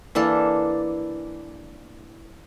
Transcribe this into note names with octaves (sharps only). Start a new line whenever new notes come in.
E3 A#3 D4 A4